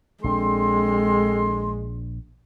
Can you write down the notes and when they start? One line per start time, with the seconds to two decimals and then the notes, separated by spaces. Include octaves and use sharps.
0.24 A#1 G#3 C4 D4 A4 C6